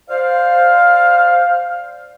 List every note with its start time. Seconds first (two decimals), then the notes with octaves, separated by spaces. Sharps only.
0.09 C5 D5 F5